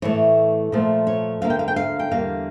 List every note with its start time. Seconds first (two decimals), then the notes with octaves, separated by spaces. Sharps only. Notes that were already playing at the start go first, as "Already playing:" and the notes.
0.02 A2 E3 A3 C#5
0.72 A#2 F3 A3
1.07 C#5
1.41 D2 D3 F3 A#3 F5
1.50 G5
1.59 F5
1.68 G5
1.76 F5
1.99 G5
2.11 E2 D3 G3 A#3 F5